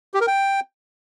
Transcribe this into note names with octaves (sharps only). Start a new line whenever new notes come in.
G4
A#4
G5